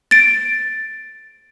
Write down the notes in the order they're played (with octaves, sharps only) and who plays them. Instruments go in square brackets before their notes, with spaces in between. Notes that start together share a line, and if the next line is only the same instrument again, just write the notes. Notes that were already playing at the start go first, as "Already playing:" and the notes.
[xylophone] A6 D7